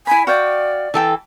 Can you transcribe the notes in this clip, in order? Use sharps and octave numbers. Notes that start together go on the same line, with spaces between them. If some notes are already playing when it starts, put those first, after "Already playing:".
E4 G#5 B5
F#4 D5 F5 G5
E3 A4 G5